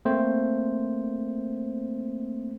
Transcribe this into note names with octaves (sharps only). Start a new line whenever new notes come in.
A3 A#3 C4 C5